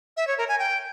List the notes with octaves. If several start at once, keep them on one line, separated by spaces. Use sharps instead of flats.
E5
C#5
A#4
G#5
G5